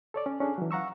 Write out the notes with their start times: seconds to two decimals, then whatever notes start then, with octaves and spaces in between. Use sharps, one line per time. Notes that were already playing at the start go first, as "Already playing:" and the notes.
0.14 A4 C#5 D5
0.26 C#4
0.40 C#4 D4 G#4 A4
0.58 E3 F#3
0.71 F5 F#5 A#5 C#6 E6